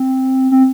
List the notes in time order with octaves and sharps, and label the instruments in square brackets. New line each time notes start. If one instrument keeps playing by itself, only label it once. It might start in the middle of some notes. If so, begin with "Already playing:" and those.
Already playing: [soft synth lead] C4
C4